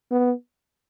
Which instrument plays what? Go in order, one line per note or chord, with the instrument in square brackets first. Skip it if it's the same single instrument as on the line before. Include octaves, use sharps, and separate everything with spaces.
[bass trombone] B3